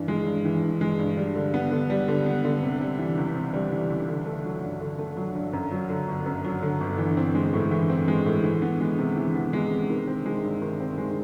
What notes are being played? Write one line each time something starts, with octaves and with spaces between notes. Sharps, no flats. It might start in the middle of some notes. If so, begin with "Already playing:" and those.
Already playing: G2 E3
G#3
G2
E3
G2
G#3
G2
G3
D3
B3
D3
G3
D3
B3
D3
C3
G3
E3
C#2
C3
G3
E3
C#2
D3
A3
F#3
G2
D3
A3
F#3
G2
F#2
F#3
D3
G1
F#2
F#3
D3
G1
E3
C4
G#3
A2
E3
C4
G#3
A2
E3
B3
G#3
C3
E3
B3
G#3
C3
D#3
C4
G#3
G2
D#3
C4
G#3